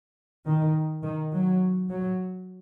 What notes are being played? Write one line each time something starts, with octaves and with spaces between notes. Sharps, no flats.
D#3
D#3
F#3
F#3